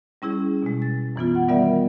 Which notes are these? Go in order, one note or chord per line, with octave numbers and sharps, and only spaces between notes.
G3 C#4 E4 G#4
B2 G#3
A6
F#2 E3 B3 F4
F#5
D#3 G3 B3 A#4 D5 E5